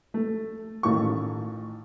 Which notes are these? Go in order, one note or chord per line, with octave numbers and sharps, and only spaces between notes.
A3
A1 A2 D#3 A3 F4 C#6